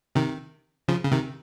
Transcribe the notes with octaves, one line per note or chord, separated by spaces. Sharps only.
C3 D#3
C#3 F3
C#3
C3 D#3